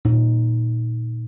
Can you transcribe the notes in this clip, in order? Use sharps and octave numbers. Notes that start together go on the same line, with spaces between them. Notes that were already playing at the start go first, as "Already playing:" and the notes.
A#2 D#4